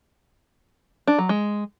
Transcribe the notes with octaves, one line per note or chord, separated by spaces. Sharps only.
D4
F#3
G#3